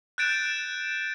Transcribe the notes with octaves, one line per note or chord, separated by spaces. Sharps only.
F#6 G6 A6 D7 E7